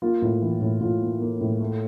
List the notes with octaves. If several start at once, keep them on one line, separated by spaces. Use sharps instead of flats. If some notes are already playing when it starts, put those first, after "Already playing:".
A#3 F4
A2
E3
A2
A2 F4
A#3
A#3
A2
A3